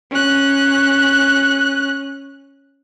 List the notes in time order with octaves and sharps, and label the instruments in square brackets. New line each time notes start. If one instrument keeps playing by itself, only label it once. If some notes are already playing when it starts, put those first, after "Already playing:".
[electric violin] C#4 F#6